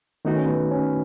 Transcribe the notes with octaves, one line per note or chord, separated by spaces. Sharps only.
D#3 A3 B3 D#4 F#4
C#4
B3
C#4